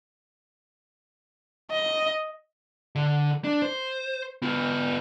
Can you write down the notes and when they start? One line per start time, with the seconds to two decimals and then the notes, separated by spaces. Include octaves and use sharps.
1.71 D#5
2.95 D3
3.44 D4
3.62 C5
4.42 B3 F4